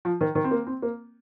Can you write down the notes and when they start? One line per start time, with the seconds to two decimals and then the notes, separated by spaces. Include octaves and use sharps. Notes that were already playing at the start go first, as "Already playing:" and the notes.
0.05 F3
0.21 D#3
0.35 D#3
0.44 C4
0.51 A#3
0.67 C4
0.82 A#3